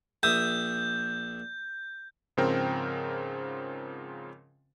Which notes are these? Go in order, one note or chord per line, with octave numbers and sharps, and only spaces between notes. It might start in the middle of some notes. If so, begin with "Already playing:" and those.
A#1 E5 D#6 G6
G#2 C#3 F3 C4 A#4 G5